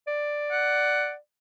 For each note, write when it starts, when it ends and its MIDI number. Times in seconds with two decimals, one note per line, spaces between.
0.07 1.17 74
0.51 1.12 78